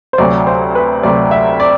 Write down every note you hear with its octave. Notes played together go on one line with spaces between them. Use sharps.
C5
D2 C3 F#3 D5
C5
B4
D2 C3 F#3 D5
E5
D5